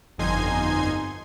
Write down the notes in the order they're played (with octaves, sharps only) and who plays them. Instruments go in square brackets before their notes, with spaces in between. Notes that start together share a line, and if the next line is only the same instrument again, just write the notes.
[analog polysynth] G1 F2 D#4 G#5 C6 G#6